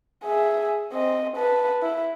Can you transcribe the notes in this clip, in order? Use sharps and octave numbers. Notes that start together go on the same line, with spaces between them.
G#4 E5
C4 D#5
B4 A5
E4